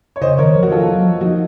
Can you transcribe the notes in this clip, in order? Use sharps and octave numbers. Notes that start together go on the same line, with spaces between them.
C#5
C#3 C5 D#5
D#3 A#4 C#5
F3
F#4
F3 F4 A4
F#3
F3
F3 D#4 F#4